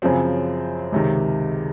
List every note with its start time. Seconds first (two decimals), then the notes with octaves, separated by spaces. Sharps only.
0.02 F#2 C#3 F3 C4
0.92 C#2 C3 D#3